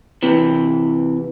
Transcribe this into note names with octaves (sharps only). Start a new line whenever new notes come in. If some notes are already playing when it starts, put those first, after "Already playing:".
C3 E3